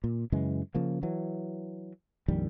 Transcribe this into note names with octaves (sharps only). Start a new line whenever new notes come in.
A#2
F#2 C#3 E3 G#3
C#3 F3 A#3
E3 F#3
A#1 F2 D#3 G3